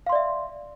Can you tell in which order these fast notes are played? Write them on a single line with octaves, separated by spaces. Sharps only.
F5 C6 D5 E5